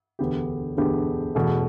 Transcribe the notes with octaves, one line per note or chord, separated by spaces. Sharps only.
E1 D2 D3 B3 G4
E1 D2 D3 B3 G4
E1 E2 B2 A3